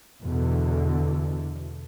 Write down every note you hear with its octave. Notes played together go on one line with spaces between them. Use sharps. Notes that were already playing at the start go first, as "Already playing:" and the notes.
E2 B2 D3